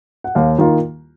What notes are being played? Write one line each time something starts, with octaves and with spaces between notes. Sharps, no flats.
F#5
D#2 F5
D#3 A#3 F4